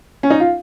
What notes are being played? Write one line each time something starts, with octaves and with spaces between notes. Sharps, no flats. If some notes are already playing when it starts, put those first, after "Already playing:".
C#4
D#4
F4